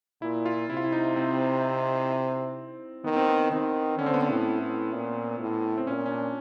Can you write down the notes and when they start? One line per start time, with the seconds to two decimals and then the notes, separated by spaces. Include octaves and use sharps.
0.22 A#2 E4
0.46 F4
0.69 C3 E4
0.77 F4
0.84 E4
0.92 D#4
1.16 C4
3.04 D#3 B3
3.16 C4
3.29 B3
3.52 D#3 C4
3.99 D3 C#4
4.06 C4
4.14 B3
4.21 C4
4.30 A2
4.61 A2
4.93 A#2
5.40 A2
5.78 C4
5.87 A#2 C#4
6.06 C#4
6.11 D4